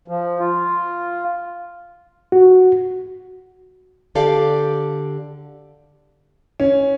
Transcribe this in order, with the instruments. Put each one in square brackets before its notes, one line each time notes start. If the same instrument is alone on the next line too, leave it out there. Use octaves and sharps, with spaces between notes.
[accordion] F3
F4
[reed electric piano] F#4
[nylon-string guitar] D3 G4 A4 D5 F5
[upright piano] C#4